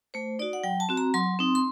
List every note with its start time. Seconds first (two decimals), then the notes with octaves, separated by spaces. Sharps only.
0.14 A3 C5
0.39 D#4 F#4 D5
0.53 F#5
0.63 F#3 G5
0.80 A5
0.89 C4 F#4
0.97 A#5
1.14 F#3 C6
1.39 C4 D#4
1.55 C6